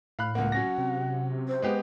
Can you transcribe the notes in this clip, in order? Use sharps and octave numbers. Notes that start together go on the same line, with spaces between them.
A2 F5 B5 F#6
C#2 A#3 F#5
F#3 C#4 A#6
C3
C5
G#3 B3 G4